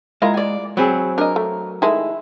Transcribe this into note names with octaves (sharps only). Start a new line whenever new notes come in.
G#3 A#3 E4 F4 A#5
D5 G#5
F#3 C4 G#4 B5
D4 A#4 D#5
A3
D#3 G#3 A3 E4